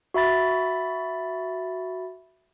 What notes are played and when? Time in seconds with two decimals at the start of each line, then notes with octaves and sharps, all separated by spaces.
0.14 F#4 E5 B5 A6